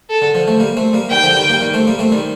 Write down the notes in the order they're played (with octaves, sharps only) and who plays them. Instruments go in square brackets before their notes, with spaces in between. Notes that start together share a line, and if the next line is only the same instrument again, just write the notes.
[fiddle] A4
[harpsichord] D3
D3 F3
F3 A3
G3 A#3
A3 C4
G3 A#3
[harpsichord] D#3 G3 [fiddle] G5
[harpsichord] D3 F3
D#3 G3
G3 A#3
D#3 G3
A3 C4
G3 A#3
A3 C4
D#3 G3